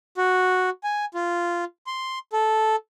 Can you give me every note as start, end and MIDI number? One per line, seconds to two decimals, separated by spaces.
0.18 0.70 66
0.84 1.05 80
1.14 1.64 65
1.87 2.19 84
2.33 2.76 69